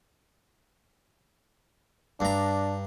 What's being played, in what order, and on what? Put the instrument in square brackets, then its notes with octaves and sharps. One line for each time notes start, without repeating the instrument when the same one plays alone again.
[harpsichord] G2 A#5 [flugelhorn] D4